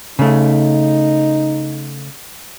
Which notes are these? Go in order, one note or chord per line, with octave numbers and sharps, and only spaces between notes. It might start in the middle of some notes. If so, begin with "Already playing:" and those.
C#3 A3 D#4